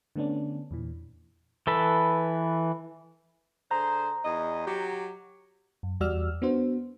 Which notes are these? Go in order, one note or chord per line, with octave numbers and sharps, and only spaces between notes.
D3 A3 B3 C#4 D4
E2 A#2 E3
E3 A4 B4
D3 G#4 C5 A#5
E2 D#5
F#3 F#4 G4
F#2
E2 G3 F#4 D5 E6 F6
B3 D4 F#4 C5